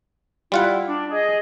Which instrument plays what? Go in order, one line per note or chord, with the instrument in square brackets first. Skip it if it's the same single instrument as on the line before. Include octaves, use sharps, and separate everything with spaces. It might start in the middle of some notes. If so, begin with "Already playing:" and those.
[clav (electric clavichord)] G3 F4 F#5 [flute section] E4
[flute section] D4
G#4 D#5